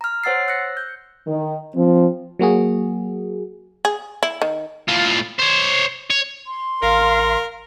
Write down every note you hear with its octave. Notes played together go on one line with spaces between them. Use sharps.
A#5 F6
C5 C#5 F#5 E6 A6 C7
E6 F#6 A#6 C#7
G6
D#3
F3 C4
F#3 A#3 F#4 G#4
G#4
E4
D#3
A2 F4
C5 C#5
C#5
C6
A1 A#4 F5